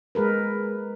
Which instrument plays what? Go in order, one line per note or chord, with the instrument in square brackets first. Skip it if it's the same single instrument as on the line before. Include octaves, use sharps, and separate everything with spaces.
[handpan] G#3 G#4 A#4 B4